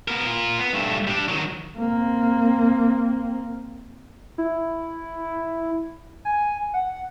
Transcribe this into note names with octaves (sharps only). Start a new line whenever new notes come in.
B3 A#4
F4 A#4
B3
G2 A3
G3 D4
D#3 F#3
A#3 C4
E4
G#5
F#5